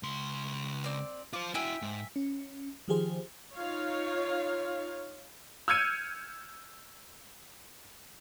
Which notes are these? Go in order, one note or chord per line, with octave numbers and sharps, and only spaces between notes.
C#2 C6
C4 D5
F4 C5 D6
E4 F#4 E5 G5 G#5
G#2
C#4
D#3 F3 F4 G4 G#4 C5
D#4 F4 C#5 F5
E6 F6 G6 G#6 C#7 D#7